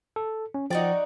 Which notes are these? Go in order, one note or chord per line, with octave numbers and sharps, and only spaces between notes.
A4
C#4
F3 D#4 F#4 D5 G5 A6